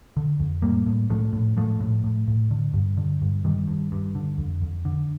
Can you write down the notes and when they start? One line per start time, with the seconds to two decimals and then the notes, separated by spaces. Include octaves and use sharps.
0.17 D3
0.40 F2
0.62 A2 G3 A#3
0.86 A2
1.10 A2 F3 A3
1.33 A2
1.57 A2 F3 A3
1.81 A2
2.04 A2
2.28 A2
2.51 D3
2.74 G2
2.97 D3
3.22 G2
3.44 G2 D#3 G3
3.68 G2
3.92 G2
4.15 D3
4.38 F2
4.62 F2
4.85 D3